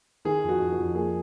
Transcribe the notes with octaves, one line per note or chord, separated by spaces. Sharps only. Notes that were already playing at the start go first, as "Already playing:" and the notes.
D#3 G#4
F2
F#4
F2
F#4
F2
A#3 G#4